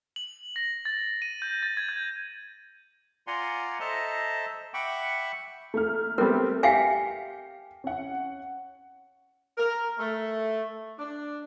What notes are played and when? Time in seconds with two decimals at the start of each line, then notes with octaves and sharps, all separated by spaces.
0.16 F#7
0.56 A#6
0.85 A6
1.22 D#7
1.42 G6
1.63 A6
1.77 G#6
1.89 G6
3.27 F4 D5 F#5 G#5 A#5 C6
3.80 A4 C5 D#5 E5 A5 A#5
4.74 E5 F#5 G5 B5 C#6 D6
5.74 A3 A#3 F6
6.18 G3 A3 B3 C4 A#4
6.63 G4 E5 F5 G#5 C7 C#7
7.84 C#4 F#5
9.57 A#4
9.99 A3
10.99 D4